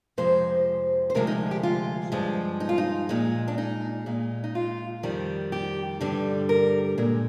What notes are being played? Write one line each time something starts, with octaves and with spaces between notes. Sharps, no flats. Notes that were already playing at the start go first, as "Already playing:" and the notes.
F2 C3 F3 G#3 C5
C5
D2 C3 F3 G#3 A#4
D#4
G4
F4
G2 F3 G#3
D#4
F4
D#4
A#2 G#3
D4
D#4
A#2 G#3
D#4
F4
F2 D#3 G3
G4
G2 D3 G3
A#4
A#2 G#3